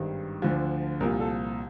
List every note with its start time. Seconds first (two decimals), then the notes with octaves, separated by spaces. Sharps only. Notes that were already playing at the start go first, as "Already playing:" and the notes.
Already playing: G#1 G2 D#3
0.42 D2 D3 F3
1.00 C2 A#2 F3 A#4
1.20 A4